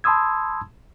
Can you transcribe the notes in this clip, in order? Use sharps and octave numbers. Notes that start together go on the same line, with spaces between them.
A5 B5 C6 D#6 E6 G#6